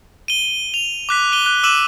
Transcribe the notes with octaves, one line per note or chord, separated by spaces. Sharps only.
D#7 G7
F7
D6 F#6 B6
D#7 G7
F#6
D6 E6 D#7 E7 F#7